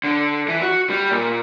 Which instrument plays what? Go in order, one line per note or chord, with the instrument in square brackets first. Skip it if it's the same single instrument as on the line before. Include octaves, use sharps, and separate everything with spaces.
[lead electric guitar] D3
E3
F#4
G3
A#2